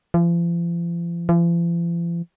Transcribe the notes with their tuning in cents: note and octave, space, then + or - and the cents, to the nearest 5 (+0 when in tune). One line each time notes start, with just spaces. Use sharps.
F3 -40
F3 -45